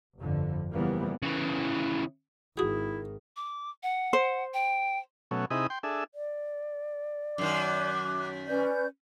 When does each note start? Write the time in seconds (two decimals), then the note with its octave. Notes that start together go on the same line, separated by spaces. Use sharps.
0.18 G1 F2 D3
0.73 C#3 E3 F3 G3 A#3 B3
1.22 C#3 E3
2.57 G#1 D#3 E4 F#4 G#4 G5 D#6
3.36 D6
3.83 F#5
4.13 C5
4.54 G5
5.31 B2 F#3 A3 C#4
5.50 C3 D#4 E4 G#4 D#5 B5
5.70 G5 C6
5.83 D4 G#4 A4 E5
6.13 D5
7.38 F#2 D#3 D6 F#6
8.47 C#4 B4 D5 G6